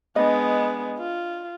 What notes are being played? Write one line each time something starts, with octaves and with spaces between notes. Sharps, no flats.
G#3 B3 D4 D#5
F4